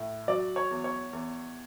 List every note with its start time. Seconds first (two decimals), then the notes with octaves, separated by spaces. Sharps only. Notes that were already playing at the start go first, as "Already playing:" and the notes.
Already playing: A2
0.28 F#3 D5
0.56 C#5
0.71 E2
0.84 C#5
1.13 E2